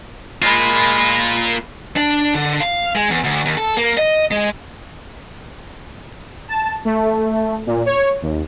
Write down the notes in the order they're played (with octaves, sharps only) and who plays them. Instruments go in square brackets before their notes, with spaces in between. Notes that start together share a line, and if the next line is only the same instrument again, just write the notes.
[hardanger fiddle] G#3 B5 [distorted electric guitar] A#3 F4
[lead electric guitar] D4
D3
F5
G#3
E2
D2
D#2
A4
A#3
D#5
G#3
[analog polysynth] A5
A3
A#2
C#5
D#2